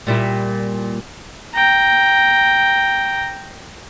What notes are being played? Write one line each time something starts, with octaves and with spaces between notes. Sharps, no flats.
A#2 G3 E4
G5 A#5